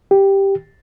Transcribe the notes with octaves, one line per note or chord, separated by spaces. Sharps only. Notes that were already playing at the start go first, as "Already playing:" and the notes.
G4